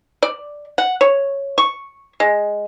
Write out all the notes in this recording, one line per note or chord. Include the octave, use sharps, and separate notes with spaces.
D5
F#5
C#5
C#6
G#3